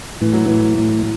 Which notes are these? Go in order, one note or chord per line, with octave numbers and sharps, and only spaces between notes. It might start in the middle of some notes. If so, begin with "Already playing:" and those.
A2 E3
F#3
A2 E3
A2